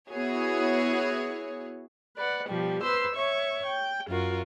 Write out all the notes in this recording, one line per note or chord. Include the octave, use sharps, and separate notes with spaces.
B3 E4 F#4 G#4 C#5
B4 D5 F#5
B2 F3 G3 G4
B4 C5 C6 E6
C#5 E5 C#6
G5
F#2 F4 F#4 A#4